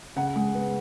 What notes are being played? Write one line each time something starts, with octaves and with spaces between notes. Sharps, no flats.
C#3 F#5
G#3
B3